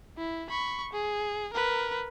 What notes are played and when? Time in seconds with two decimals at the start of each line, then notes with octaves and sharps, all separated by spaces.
0.18 E4
0.50 B5 C#6
0.93 G#4
1.53 A#4 B4